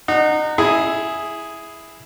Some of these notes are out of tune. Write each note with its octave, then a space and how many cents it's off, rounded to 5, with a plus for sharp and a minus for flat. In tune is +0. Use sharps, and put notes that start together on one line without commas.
D#4 -25 F#5 +0
E4 +0 G#4 +0